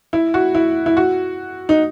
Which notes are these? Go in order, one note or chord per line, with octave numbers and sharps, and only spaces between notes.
E4
F#4
E4
E4
F#4
D#4